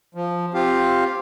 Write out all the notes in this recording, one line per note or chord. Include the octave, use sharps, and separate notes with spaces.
F3
C4 F4 G4 F5